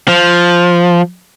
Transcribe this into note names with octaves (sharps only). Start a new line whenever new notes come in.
F3